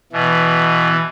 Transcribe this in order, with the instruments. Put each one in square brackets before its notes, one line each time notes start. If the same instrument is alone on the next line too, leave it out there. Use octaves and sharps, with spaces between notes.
[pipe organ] B2 E3